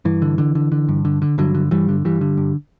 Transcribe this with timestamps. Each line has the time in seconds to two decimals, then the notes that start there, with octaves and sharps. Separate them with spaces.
0.05 G2 E3
0.22 D3
0.38 D3
0.55 D3
0.72 D3
0.89 G2
1.05 D3
1.22 D3
1.38 G2 D3 F#3
1.55 D3
1.71 G2 E3 G3
1.89 D3
2.05 G2 E3 G3
2.21 D3
2.38 G2